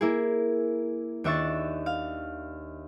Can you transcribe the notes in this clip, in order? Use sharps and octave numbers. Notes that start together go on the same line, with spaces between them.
A#3 E4 G#4
D#2 D4 E5 C#6 A6
F5